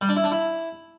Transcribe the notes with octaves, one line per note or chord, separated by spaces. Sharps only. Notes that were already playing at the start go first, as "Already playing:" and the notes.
G3
D4
E4
D4
E4